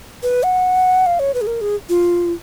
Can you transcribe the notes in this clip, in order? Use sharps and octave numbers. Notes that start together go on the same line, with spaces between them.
B4
F#5
F5
C#5
B4
G#4
A#4
G#4
F4